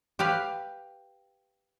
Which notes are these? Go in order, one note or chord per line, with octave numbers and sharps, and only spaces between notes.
G4 B4 F5